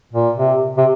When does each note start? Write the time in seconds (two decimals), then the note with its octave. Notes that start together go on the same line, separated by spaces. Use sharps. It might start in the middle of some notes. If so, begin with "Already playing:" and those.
0.13 A#2
0.37 C3
0.77 C3